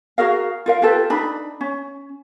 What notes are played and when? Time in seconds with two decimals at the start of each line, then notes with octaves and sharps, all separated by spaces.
0.18 F#4 G#4 A#4 F5
0.66 F4 A#4 F5
0.82 F4 G4 A4 B4
1.10 D4 D#4 B5
1.61 C#4